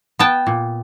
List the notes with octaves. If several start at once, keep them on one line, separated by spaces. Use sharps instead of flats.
B3 G5 A5
A#2